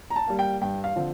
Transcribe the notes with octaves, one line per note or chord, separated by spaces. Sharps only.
A#5
A5
G3 A#3
G5
G2 G5
F5
D3 F3 C4